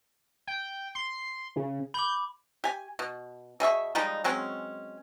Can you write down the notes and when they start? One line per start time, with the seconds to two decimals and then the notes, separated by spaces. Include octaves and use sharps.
0.47 G5
0.95 C6
1.56 C#3
1.94 B5 D6 G6
2.64 G4 G#5
2.99 B2
3.60 B2 G#4 E5 C#6
3.95 F3 G3 G#3 D#4
4.24 F#3 G#3 C4 C#4